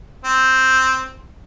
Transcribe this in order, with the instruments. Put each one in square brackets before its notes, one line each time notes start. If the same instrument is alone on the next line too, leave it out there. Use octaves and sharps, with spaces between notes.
[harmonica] C4